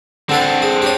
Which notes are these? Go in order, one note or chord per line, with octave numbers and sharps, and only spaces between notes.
D3 C4 D4 A4 B4
G#4
G4 C#5